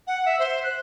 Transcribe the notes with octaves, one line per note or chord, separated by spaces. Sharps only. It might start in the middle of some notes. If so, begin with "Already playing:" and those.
F#5
E5
C5
F#6